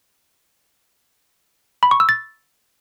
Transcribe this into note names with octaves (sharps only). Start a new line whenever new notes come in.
B5
C#6
E6
A6